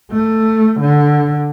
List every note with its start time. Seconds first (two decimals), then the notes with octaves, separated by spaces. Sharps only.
0.11 A3
0.80 D3